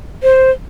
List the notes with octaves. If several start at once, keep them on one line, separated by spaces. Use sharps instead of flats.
C5